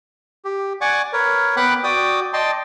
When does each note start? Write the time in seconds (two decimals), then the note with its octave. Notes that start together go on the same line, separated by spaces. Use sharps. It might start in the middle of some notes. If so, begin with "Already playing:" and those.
0.45 G4
0.81 D5 F#5 G#5 C#6 D6
1.13 A#4 B4 C#5
1.57 B3 F#5 G5 B5 D6 F#6
1.84 F#4 D5 G5 D6 D#6
2.33 D5 D#5 G5 A5 C6